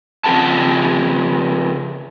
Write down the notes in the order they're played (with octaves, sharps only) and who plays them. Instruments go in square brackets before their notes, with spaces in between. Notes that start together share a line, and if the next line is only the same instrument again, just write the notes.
[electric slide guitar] C#3 F3 C4 A4 F#5 A5